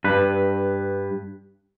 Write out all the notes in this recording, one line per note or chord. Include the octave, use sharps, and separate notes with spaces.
G2 B4